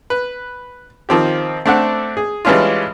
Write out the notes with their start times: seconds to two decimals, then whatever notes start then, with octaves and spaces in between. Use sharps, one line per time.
0.10 B4
1.09 D#3 F3 C4 G4
1.66 A3 C4 D4 A4 F#5
2.17 G#4
2.45 E3 G3 G#3 C#4 D4 F4